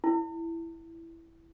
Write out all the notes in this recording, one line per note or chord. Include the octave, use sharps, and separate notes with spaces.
E4